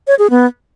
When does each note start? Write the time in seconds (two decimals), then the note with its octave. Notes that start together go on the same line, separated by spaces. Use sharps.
0.07 C#5
0.19 G#4
0.30 B3